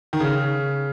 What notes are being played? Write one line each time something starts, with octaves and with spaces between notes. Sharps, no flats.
D#3
C#3